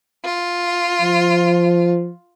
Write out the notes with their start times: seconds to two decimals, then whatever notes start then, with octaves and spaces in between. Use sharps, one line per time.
0.25 F4
1.02 F3